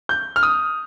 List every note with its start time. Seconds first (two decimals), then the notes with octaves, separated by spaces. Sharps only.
0.09 G6
0.36 F6
0.43 D#6